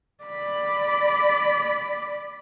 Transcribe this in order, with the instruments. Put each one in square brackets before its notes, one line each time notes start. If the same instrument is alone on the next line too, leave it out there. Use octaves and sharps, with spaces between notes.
[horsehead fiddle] D5 B5